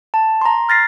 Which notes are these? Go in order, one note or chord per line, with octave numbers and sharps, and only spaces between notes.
A5
A#5 C6
F6 A6 A#6 C7